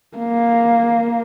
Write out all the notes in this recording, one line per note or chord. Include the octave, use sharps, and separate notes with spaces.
A#3